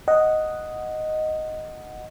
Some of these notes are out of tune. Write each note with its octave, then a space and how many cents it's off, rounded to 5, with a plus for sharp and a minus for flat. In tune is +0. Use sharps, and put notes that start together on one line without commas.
D#5 +0 F#5 +0